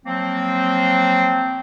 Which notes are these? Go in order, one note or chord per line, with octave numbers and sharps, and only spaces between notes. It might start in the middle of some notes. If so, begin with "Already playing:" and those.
F3 F#3 A#3 C4